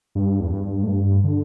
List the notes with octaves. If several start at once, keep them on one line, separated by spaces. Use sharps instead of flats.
G2
E2
G2
A2
G2
D3